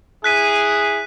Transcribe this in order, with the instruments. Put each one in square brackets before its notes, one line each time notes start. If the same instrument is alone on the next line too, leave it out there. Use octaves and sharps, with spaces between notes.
[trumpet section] E4 G#4 [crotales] F#6 B6 D#7